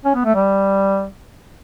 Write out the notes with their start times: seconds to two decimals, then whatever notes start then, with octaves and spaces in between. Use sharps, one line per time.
0.05 C#4
0.15 B3
0.25 A3
0.35 G3